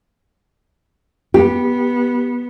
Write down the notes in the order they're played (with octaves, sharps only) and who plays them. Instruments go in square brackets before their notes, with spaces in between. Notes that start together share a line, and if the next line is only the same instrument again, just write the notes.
[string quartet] B3 [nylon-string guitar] G4